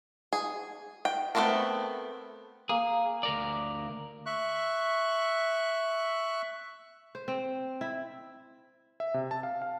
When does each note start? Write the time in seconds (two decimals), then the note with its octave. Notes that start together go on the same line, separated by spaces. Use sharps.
0.33 G#4
1.05 G5
1.35 A3 B3 C4 A4 A#4
2.69 A#3 G#4
3.23 D2 A#4 D5
4.26 E5 C#6 F#6
7.15 C5
7.28 C4
7.81 E4
9.00 E5
9.14 C3
9.31 A5
9.43 F5
9.62 F5